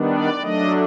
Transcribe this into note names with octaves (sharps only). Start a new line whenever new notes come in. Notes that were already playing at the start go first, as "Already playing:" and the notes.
Already playing: D#3 G3 B3 D4
D5
F#3 A3 D4 D#5